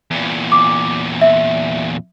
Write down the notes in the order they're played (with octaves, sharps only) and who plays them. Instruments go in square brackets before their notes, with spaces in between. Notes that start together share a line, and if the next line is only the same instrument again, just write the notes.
[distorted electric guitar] E2 A#2
[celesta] D6
E5